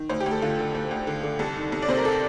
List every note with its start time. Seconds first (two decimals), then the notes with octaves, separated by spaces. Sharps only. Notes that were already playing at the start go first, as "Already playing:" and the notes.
Already playing: D#3
0.09 D2 C5
0.20 G4
0.26 D2
0.31 A4
0.42 D3 F4
0.59 D3
0.75 D2
0.91 D2
1.07 D3
1.23 D3
1.39 C2 A4
1.56 D#3
1.72 C2
1.82 D5
1.88 C3 C5
1.97 A#4
2.05 A4